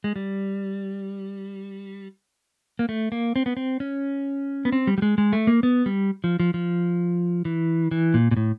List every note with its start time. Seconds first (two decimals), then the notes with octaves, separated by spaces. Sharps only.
0.04 G#3
0.16 G3
2.79 A#3
2.89 A3
3.12 A#3
3.36 C4
3.46 B3
3.57 C4
3.80 C#4
4.65 B3
4.72 C4
4.87 G3
4.98 G3
5.02 G#3
5.18 G#3
5.33 A3
5.47 A#3
5.63 B3
5.86 G3
6.24 F3
6.40 F3
6.54 F3
7.45 E3
7.91 E3
8.14 A#2
8.31 A#2
8.37 A2